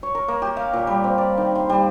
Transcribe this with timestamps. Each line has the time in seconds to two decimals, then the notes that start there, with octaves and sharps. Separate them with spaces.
0.03 C#5
0.15 A#4
0.28 A#3
0.42 G4
0.57 F5
0.73 A#2
0.87 G3
1.04 C4
1.18 D5
1.38 D#3
1.55 C6
1.70 G3